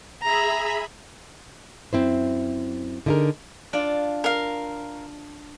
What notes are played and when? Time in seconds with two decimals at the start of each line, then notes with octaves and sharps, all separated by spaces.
0.23 G#4 E5 A#5 B5
1.93 F#2 C3 C4 E4 C5
3.06 D3 D#4 E4 G#4 A#4
3.73 D4 F4 D5
4.24 A#4 F5